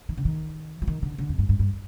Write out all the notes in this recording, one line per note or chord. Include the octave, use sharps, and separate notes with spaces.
D#3
D3
D#3
F3
D#3
D3
D3
F2
G2
G2
G2